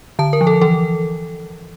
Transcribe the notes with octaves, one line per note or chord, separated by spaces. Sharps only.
D3 A5
A#4
F3
A4
E3 A4